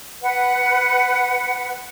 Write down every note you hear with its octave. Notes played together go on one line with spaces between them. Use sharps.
B4 F#5